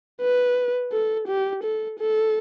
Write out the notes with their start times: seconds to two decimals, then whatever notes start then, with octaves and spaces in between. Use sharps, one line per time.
0.22 B4
0.92 A4
1.28 G4
1.63 A4
1.99 A4